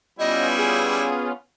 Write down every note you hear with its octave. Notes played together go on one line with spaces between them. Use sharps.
G3 B3 C#4 E4 F4 D#5
G#4